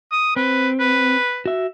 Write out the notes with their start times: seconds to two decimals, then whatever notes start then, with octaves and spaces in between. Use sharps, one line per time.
0.12 D#6
0.36 C4 B4
0.80 B4
1.46 F#4 E5